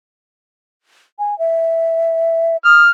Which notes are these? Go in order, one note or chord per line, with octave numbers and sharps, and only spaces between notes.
G#5
E5
D#6 F6